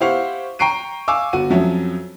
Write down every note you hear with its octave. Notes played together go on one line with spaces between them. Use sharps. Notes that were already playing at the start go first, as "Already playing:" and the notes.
E4 G4 C5 F5 F#5 C#6
G5 A#5 C#6 C7 D7 D#7
F5 G#5 C#6 D6 E6
G1 F#4 D#7
F2 F3 F#3 C#4 E5